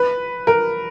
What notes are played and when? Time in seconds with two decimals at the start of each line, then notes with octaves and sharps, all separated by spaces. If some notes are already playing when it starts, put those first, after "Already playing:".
Already playing: B4
0.47 A#4